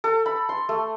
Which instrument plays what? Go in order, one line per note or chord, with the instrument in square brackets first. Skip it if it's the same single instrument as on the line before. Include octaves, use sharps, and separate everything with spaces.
[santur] A4
B5
C6
A3